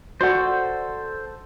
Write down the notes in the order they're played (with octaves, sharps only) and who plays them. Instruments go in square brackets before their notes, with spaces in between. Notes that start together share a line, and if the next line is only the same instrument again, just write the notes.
[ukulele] F#4 D5 F#5 [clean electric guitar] A4 C5